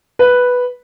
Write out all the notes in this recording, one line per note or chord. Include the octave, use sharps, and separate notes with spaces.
B4